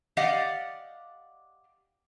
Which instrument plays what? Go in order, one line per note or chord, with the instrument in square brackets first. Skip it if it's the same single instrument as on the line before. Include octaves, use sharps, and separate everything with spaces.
[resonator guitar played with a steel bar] G4 D5 D#5 F5 F#5